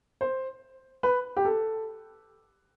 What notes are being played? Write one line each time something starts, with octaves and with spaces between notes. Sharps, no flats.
C5
B4
G4
A4